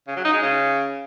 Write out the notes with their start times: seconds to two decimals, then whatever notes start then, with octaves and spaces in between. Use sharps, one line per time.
0.08 C#3
0.16 F#3
0.25 D#4
0.34 G#3
0.42 C#3